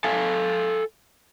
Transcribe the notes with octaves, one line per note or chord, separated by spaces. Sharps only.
A4 F5 G#5